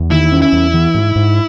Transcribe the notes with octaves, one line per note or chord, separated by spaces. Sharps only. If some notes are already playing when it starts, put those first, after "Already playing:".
Already playing: E2
D#3 E4
C#4
E4
E2
E3
G#2
G#2